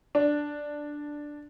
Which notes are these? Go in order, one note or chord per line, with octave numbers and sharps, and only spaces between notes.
D4